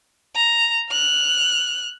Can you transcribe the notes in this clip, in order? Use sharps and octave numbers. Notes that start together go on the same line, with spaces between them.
A#5
F6 F#6